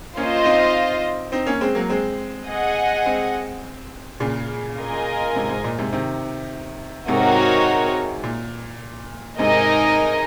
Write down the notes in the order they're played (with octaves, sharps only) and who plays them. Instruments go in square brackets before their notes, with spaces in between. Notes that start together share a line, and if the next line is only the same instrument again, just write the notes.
[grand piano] A#3 C#4 [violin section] F4 C5 D#5
[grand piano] C4 D#4
C4 D#4
A#3 C#4
G#3 C4
F#3 A#3
G#3 C4
[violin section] G#4 D#5 F#5
[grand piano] G#3 C4
A#2 C#3
[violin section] F4 A#4 D#5 G#5
[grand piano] G#2 C3
G#2
A#2
G#2 C3
C3 D#3
[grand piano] G#2 C3 [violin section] C4 D#4 F#4 A#4 C#5
[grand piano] A#2
[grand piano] G#2 C3 [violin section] D#4 A#4 D#5 G#5